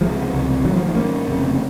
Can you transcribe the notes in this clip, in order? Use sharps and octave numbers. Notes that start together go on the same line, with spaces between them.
C#2 C3 F3 G#3
C#2 C3
G#1 D#3 F#3
G#2
F3
F3
G#1 G#2 A#3 C#4
F1 F2 C#3